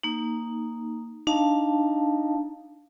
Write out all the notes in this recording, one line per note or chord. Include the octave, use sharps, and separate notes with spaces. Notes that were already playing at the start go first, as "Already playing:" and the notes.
A#3 D#4
D4 D#4 F5 A5